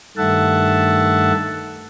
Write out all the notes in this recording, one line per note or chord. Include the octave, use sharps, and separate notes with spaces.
G2 D#3 A3 E5 F#5 A5